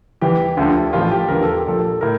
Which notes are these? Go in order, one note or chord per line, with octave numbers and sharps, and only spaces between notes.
E2 E3 G4
D2 D3 F3
A1 A2 F3 F4
G4
E1 E2 D3 F3 A#4
A4
G4
A#1 A#2 F3 A4
A2 A#4